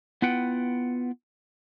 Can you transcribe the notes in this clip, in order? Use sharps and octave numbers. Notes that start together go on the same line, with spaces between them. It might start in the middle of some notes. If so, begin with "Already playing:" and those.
B3 E4 F4 B4 F#5 G5